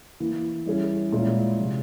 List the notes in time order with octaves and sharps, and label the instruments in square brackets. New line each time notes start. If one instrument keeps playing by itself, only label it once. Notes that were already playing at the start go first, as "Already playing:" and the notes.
[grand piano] E3 A#3 E4
E3 G3 C#4 E4 G#4
A#2 G#3 C#4 E4
C3 F3